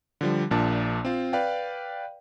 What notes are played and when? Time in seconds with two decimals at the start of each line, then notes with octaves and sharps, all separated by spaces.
0.21 D3 F3 G3
0.51 A#1 A#2 D4 A5
1.05 C4 F4
1.33 B4 D5 F5 G5